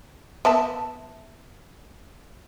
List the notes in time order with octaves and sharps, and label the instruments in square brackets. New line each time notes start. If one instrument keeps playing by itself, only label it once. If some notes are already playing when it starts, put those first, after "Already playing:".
[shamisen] B3 E5 A5